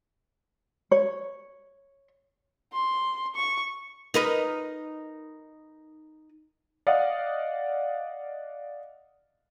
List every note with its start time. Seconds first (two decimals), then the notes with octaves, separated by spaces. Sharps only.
0.91 C#5
2.73 C6
3.35 C#6
4.14 D#4 A#4 B4
6.87 D5 D#5 F5 F#5 D#6